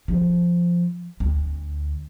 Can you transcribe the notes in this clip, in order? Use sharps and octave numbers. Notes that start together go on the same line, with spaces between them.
F3
D2